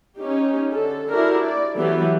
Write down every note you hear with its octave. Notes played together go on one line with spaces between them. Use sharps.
C#4 D#4 G4
D3 A4
D4 E4 F#4 G4 A#4
D5
E3 F#3 A3 B3 G4